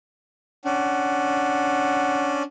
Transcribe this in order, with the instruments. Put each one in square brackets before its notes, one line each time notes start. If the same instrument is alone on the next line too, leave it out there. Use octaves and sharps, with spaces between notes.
[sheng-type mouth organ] C#4 D4 [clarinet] F#5